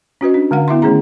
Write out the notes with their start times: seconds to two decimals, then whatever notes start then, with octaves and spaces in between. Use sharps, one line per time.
0.21 C#4 F#4 B4 D#5
0.34 D4
0.51 D3 G#3 F5 F#5
0.68 B3 E4 E5 C6
0.82 D#3 A3 C#4 G#4 A#5